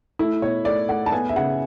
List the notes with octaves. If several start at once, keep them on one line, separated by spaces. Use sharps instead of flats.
A3 E4
B2 C#5
A3 D5
A3 F#5
A5
B3 G#5
E5
C#3 F#5